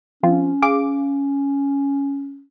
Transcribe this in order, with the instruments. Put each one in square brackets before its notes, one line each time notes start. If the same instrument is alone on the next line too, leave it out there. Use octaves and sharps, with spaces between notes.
[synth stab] F3 C4 F4 [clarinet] C#4
[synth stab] G#4 F5 D6